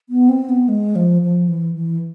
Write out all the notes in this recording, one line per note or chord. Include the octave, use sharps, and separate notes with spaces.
B3
C4
B3
G#3
F3
F3
E3
E3